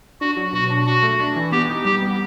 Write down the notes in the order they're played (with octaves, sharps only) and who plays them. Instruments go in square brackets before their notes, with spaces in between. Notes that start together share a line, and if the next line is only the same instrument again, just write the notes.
[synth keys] D4 [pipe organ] F#4
[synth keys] F#3
[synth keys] B2 [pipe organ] F#4
[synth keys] D4
[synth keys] D4 [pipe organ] F#4
[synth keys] A3
D4
E3
[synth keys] B3 [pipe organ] G4
[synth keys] D#4
[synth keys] G3 [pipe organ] G4
[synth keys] B3